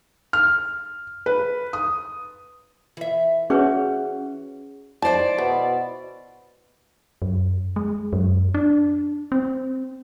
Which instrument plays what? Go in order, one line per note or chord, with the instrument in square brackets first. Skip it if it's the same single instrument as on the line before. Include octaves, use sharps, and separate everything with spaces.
[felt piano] F6
B4
D#6
[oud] E3 E5
[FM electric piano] C#4 [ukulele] F#4 [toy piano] G#4 B4 C#5
[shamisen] D#3 A5 [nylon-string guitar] E4 C5 [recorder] D5
[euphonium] B2 [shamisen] B3
[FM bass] F#2
G#3
F#2
D4
C4